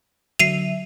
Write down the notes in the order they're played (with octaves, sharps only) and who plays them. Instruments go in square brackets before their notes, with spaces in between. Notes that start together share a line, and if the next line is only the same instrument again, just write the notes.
[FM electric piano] D3 F#3 E5 [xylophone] C7 D#7 F7